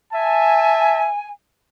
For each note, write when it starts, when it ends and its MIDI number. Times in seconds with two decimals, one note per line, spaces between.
0.12 1.08 76
0.12 1.29 80
0.12 1.08 81